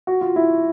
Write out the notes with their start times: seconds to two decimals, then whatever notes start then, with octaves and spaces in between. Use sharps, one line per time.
0.07 F#4
0.21 F4
0.36 E4